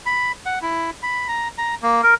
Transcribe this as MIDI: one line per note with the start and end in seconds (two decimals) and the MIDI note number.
0.06 0.32 83
0.46 0.59 78
0.62 0.90 64
1.03 1.28 83
1.28 1.48 82
1.58 1.75 82
1.83 2.01 58
2.03 2.14 70